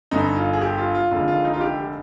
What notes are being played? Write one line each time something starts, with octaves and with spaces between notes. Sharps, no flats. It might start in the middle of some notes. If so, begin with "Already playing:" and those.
G1 G2 D3 D#4
F4
G#4
G4
F4
F4
F1 D#2 D3 G#3 F4
F4
D#4
F4
G4